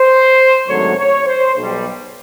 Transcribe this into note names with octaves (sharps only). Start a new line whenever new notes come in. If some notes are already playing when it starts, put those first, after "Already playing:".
Already playing: C5
G#1 F#2 D3 F#3 A3 C#5
C#5
C5
B1 B2 G3